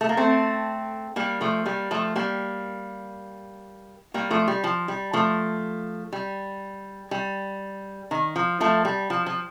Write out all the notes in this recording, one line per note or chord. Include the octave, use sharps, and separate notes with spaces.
A3
A#3
A3 C4
G3 A#3
F3 A3
G3 A#3
F3 A3
G3 A#3
G3 A#3
F3 A3
G3
F3
G3
F3 A3
G3
G3
D#3
F3
F3 A3
G3
F3
F3